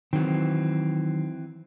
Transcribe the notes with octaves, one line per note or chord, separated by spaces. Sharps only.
D#3 E3 F#3 C4